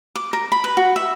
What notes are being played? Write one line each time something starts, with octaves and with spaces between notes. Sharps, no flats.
D6
A#4
B5
B4
F#4
E5